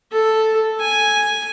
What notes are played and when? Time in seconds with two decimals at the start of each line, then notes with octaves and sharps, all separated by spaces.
0.12 A4
0.81 G#5